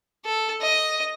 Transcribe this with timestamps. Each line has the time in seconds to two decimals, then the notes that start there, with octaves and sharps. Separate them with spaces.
0.25 A4
0.62 D#5